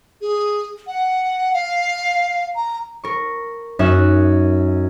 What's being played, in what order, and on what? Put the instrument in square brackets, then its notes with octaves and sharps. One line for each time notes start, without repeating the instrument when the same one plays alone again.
[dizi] G#4
F#5
F5
A#5
[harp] A#4 C#6
F#2 C#4 D#4 E5 E6 F#6